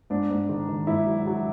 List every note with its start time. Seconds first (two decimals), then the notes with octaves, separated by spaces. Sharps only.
0.10 G#2 D4
0.31 G#2
0.49 D#3
0.68 D#3
0.87 G#2 E4
1.06 F#3
1.27 F#3